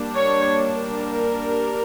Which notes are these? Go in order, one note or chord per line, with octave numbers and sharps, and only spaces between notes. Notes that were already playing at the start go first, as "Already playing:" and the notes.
Already playing: G3 A#3 D4
C#5
A#4